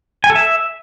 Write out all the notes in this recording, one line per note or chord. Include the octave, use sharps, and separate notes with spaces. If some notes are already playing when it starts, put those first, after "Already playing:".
G#5
A4
E5